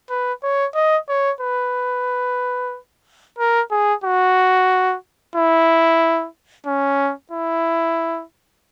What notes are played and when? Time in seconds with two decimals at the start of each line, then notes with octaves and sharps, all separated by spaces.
0.10 B4
0.43 C#5
0.75 D#5
1.09 C#5
1.41 B4
3.39 A#4
3.71 G#4
4.04 F#4
5.36 E4
6.66 C#4
7.31 E4